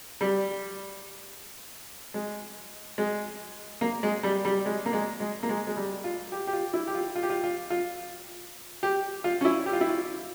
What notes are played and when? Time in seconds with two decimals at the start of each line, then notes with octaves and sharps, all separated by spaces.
0.21 G3
2.14 G#3
2.98 G#3
3.81 A#3
4.03 G#3
4.23 G3
4.45 G3
4.66 G#3
4.86 A#3
4.93 G#3
5.20 G#3
5.43 A#3
5.49 G#3
5.67 G#3
5.76 G3
6.04 F4
6.32 G4
6.47 G4
6.53 F4
6.74 E4
6.87 G4
6.95 F4
7.16 F4
7.23 G4
7.30 F4
7.44 F4
7.70 F4
8.83 G4
9.24 F4
9.41 C#4
9.45 E4
9.66 G4
9.73 F4
9.81 E4
9.89 F4